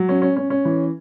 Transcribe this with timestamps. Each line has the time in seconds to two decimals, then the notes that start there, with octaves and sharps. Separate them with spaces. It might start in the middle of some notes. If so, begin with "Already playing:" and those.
Already playing: F#3
0.09 C#4
0.22 C#4
0.36 C#4
0.50 C#4
0.65 E3